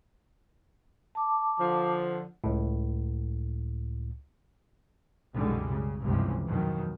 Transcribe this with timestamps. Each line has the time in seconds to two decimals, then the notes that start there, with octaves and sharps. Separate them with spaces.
1.15 A5 D6
1.60 D3 F3
2.44 C#2 A2
5.34 C2 F#2 B2 D3 G3 G#3
5.70 C#3
6.02 G1 C#2 G2 C3 E3 F3
6.47 F2 B2 D#3 F#3